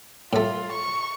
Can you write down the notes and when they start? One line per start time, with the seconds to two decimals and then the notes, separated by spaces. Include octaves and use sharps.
0.33 A2 A3 F4
0.73 C#6